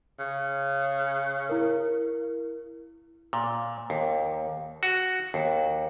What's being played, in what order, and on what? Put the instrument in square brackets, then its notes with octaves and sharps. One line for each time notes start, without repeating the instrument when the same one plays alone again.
[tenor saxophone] C#3
[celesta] E4 A#4
[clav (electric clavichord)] A#2
D#2
F#4
D#2